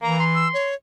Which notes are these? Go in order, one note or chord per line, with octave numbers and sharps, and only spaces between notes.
E3 A#3 A#5
C6
E6
C#5